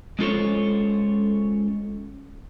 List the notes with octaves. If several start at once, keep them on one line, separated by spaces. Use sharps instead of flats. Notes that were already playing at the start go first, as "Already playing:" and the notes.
G#3 C#4 F4 A4 C5 C#5